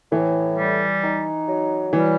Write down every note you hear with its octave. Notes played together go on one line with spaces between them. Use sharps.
A2 E3
G3
D#4
F#3
E3 G3